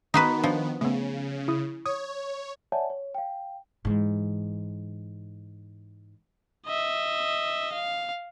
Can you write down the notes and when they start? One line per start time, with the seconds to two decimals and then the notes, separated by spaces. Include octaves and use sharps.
0.14 D#3 B3 D#4 F#4 B4
0.44 F3 D4
0.81 C#3 A3 B3
1.48 E4 D#6
1.86 C#5 D#6
2.72 C#5 D5 E5 F#5 G#5 A5
2.90 C#5
3.15 F5 G5
3.85 G#2 E3
6.67 D#5 E5
7.73 F5